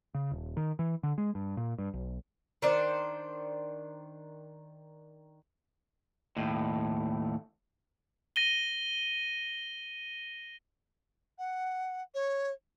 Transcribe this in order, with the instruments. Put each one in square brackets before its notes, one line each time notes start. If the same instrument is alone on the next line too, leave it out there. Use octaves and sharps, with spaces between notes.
[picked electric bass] C#3
D#1
D#3
E3
D3
G#3
G2
A#2
G2
B1
[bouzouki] D#3 D4 C5
[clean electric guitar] D#2 A2
[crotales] A#6 D#7 G7
[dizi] F#5
C#5